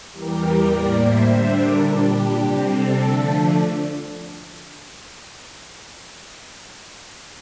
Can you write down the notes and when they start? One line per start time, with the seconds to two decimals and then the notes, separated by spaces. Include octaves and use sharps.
0.11 E2 E3 G3 G4 A#4
0.68 A2 G3 A#3 A#4 D5
0.97 C5 E5
1.25 D3 G3 D4 C5 E5
1.54 A#4 D5
1.82 A#2 G3 D4 G4
2.11 G4
2.39 C3 G3 C4
2.68 A4
2.96 D3 F3 A3 D4